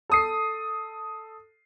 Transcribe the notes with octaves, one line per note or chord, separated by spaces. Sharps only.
A4 D#6 C7